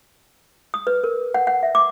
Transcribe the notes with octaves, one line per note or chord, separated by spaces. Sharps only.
D#6
B4
A#4
F#5
F#5
E5
D6